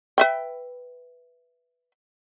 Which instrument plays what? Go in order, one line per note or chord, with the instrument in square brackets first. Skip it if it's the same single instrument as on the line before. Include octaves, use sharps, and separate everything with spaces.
[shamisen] B4 E5 G5